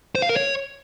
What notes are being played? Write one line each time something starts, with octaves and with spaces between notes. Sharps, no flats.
C5
F5
A#4
C#5